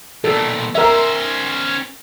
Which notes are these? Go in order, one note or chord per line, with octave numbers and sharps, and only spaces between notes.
B1 A#2 A4
C#4 A#4 C5 E5